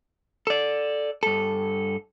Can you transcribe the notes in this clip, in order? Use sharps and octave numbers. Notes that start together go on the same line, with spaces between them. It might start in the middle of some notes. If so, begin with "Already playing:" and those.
A4 D5
G2 A4